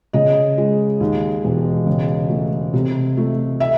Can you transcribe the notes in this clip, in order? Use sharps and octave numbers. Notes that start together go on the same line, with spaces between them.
C#3 D#5
G#3
D#2
E1
C#3
A3
C3
A3
E5